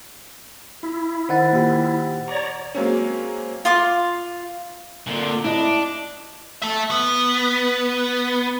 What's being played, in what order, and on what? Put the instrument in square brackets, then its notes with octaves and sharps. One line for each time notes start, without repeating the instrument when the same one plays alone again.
[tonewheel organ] E4
[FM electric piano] D#3 D#4 [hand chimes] C5 F#5 A6
[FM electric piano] A#2 D#3 G4
[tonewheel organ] C#5 D5 A#5
[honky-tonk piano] F#3 G#3 A#3 C4 C#4
[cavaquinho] F4 C6 D6
[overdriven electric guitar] A#2 D3
[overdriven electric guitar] D4 [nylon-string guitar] E4 D#5
[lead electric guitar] A4 E5
B3